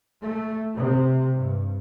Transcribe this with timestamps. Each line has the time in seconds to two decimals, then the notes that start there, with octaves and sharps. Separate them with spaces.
0.23 A3
0.75 C3
1.34 G2